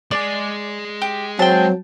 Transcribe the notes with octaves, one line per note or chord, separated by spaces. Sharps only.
G#3 G#4 D5
G4
F#3 C4 G5 A5